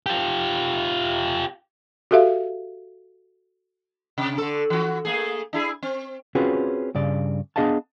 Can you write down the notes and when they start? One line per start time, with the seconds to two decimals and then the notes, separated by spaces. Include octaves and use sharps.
0.06 F4 G4
2.11 F#4 G4 A4 E5 F5
4.18 C3
4.38 D3 A4
4.70 E3 F#4
5.05 A3 A#3 G#4
5.53 D4 E4 G#4
5.83 C4
6.35 C4 C#4 F4 F#4 G#4 B4
6.95 G2 C#3 D5
7.56 B3 D4 G#4 D#5 F5 A5